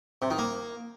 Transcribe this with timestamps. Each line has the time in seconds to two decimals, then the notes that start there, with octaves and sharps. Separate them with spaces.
0.22 C3
0.30 D#3
0.38 A#3